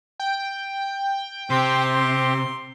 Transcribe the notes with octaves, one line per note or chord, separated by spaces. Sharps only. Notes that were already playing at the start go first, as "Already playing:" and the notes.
G5
C3 C4 G4 C6